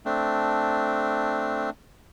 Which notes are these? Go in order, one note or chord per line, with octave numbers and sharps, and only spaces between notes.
A3 C4 D4